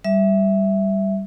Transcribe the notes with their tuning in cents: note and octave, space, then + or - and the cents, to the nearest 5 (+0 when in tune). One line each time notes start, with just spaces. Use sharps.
G3 +0 E5 +0